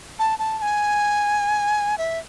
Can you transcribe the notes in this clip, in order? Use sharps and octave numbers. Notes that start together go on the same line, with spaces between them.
A5
A5
A5
G#5
E5